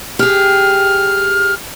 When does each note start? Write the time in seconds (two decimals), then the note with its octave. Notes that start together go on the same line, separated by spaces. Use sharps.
0.19 G4 G#4 F6